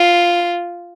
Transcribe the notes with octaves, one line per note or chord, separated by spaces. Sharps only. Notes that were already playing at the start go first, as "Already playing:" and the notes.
Already playing: F4